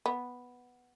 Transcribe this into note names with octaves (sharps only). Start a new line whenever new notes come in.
B3